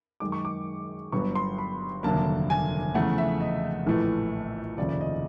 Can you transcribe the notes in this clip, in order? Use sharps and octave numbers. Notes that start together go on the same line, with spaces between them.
F#2 D#3 G#3 D6
C#6
D6
G1 G2 D3 F#3 B3 C#6
C6
B5
F1 D#2 D3 F#3 A#3 A5
G#5
E2 C#3 F3 A3 F#5
E5
D#5
A#1 A2 E3 A3
F1 D#2 C#3 F3 D5
D5
D#5